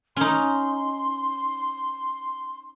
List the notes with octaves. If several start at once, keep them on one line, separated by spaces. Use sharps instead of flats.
C#4 D#4 C6